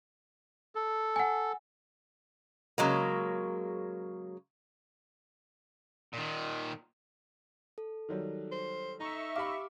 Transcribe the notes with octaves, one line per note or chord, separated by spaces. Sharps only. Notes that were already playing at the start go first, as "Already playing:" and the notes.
A4
F#5 G#5
C#3 F#3 G#3 A#3
A#2 D#3
A4
D#3 F#3 G3
C5
D#4 E5 A#5 C#6
G4 F5 B5 D6